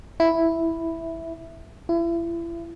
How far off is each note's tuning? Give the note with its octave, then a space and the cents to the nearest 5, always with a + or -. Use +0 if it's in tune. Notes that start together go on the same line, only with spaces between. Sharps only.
E4 +0
E4 +35